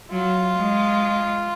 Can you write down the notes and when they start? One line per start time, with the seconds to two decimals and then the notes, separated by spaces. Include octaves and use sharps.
0.11 F#3 F4
0.56 G#3